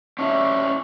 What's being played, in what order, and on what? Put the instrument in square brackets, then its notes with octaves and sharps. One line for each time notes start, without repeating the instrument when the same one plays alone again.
[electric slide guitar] C#4 D4 E4